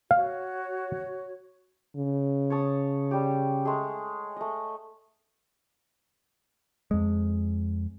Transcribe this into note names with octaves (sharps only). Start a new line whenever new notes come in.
F#4 C#5 F5
C#3
C#5 A5 D#6
G3 G4
G#3 A3 G#4
A3 D#5
F2 G#3